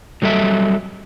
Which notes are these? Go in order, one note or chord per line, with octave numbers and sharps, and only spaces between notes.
F#3 G3 A4 D#5 E5